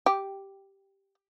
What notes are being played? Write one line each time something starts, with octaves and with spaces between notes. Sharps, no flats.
G4